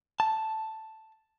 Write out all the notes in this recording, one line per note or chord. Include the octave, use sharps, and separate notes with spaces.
A5